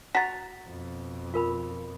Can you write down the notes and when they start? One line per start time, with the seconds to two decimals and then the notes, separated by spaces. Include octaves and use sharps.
0.15 F#4 A#5 A6 B6
0.67 F2 B2
1.34 F4 A#4 B5